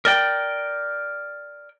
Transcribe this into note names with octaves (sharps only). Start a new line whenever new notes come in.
A#4 D5 G5